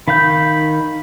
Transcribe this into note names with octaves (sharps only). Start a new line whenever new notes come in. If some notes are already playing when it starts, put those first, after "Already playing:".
D#3 F5 B5 G6